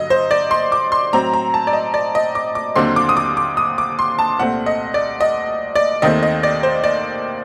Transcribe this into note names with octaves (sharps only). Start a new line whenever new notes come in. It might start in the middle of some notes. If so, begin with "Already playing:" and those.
Already playing: G2 D3 F#3 D#5
C5
D5
C6
D6
C6
A2 F#3 C4 A#5
A#5
A5
D5
D#5
D5
D#5
D6
D6
D#2 D3 F#3 C4 C6
D6
D#6
D6
D6
D#6
D6
C6
A5
C2 A#2 A3 C4 F#5
D#5
D5
D#5
D5
D#2 D#3 A3 C4 D#5
D#5
D5
C5
D5